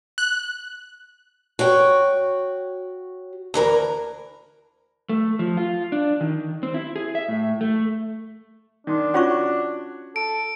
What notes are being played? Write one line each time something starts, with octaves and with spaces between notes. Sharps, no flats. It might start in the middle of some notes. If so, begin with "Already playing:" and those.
F#6
F#4 C#5 G5
D2 E3 A#4
A3
F3
F4
D4
D#3
C4
E4
G#4
E5
A2
A3
D#3 D4 C6
C#4 F4 F#4 C#5 F#5 C#6
A4 D7